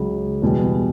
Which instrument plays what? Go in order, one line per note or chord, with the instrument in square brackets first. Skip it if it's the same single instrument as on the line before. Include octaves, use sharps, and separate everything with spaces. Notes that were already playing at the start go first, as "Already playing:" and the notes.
Already playing: [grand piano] C#2 C#3 F#3
E2 B2 G3